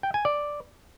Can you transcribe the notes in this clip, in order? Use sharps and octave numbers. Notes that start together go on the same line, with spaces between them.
G5
G#5
D5